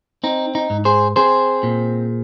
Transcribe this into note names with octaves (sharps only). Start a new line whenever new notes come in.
C4 D#4
D#4
G#2
G#4 C5
C4 G#4 C5
A#2